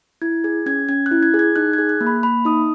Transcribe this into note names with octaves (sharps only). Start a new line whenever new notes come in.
E4 G#6
G#4 G#6
C#4 G#6
C#4 G#6
F#6
E4
G#6
G#4
G#6
D#4 F#6
G#4 G#6
F#6
A#3
B5
A#3 B5
D#4 D#6